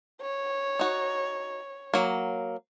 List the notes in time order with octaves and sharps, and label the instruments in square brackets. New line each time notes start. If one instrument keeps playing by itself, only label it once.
[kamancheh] C#5
[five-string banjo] D#4 F#4
F#3 A#3